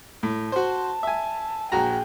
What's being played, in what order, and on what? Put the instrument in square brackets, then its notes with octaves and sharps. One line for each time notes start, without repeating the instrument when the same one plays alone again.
[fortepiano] A2
[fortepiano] F#4 C5 [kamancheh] A5
[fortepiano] E5 G#5
[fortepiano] A#1 F#4 A#5 [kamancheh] G#4 G5